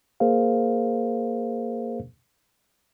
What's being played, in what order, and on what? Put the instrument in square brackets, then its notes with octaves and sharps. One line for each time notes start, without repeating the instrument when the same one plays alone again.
[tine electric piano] A#3 G#4 A#4 C5 F5